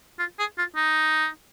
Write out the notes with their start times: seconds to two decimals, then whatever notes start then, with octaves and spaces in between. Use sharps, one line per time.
0.19 F4
0.39 G#4
0.58 F4
0.76 D#4